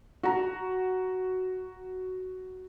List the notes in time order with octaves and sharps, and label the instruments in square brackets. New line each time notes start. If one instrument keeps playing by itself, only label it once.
[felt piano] F#4 A#5